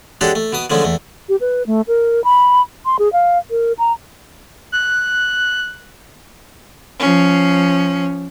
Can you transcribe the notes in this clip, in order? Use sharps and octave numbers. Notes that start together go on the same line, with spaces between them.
G#3 C#4 D4 F#4 G4 A4
A3
B2 B3 D#6
D3 F3 G#3 A3 C#4
E2 A3
G4
B4
A3
A#4
B5
C6
G#4
F5
A#4
A#5
F#6
F3 C#4